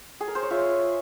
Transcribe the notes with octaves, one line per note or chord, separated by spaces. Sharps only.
G#4
A#4
C5
C#5
F4 E5